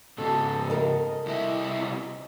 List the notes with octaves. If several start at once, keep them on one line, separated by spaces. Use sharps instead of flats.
G#2 C#3 A4
A4 A#4 D#5
C2 E4